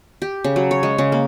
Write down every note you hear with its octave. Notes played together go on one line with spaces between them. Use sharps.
G4
C#3
F#3
C#5
G#3
C#3
A#3